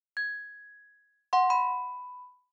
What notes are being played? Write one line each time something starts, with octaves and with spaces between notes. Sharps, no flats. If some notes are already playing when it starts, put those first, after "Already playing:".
G#6
F#5 C6
B5